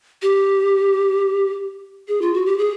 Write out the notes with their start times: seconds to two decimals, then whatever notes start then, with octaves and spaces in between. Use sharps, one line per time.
0.22 G4
2.08 G#4
2.22 F4
2.34 F#4
2.46 G4
2.58 G#4